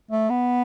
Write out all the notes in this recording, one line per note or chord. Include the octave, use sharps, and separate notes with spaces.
A3
B3